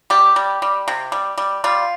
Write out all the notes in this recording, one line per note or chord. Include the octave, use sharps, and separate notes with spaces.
G3 G4
G3
G3
C3
G3
G3
G3 F4